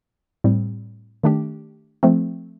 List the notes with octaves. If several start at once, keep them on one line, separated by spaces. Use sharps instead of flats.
A2 G3 C4
D#3 A3 D4 G4
F3 A3 C4